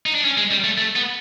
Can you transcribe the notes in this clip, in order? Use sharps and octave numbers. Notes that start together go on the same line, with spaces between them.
D#4
D4
C#4
G#3
G3
A3
A3
B3